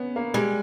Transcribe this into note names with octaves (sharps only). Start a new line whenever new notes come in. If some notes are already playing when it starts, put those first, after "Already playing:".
Already playing: B3 C#4
A#3
G3 G#3